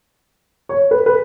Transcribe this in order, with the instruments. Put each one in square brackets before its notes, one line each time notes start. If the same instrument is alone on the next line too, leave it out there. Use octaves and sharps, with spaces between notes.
[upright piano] C#5
B4
B4